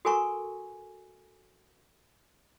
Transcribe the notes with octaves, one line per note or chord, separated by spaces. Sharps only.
F#4 A4 A#4 G#5 A#5 C#6